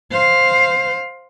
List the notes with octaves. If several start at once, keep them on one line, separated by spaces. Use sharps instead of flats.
C5 F5